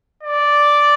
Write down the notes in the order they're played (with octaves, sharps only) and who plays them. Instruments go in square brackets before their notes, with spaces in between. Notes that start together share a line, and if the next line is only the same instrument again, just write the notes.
[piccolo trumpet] D5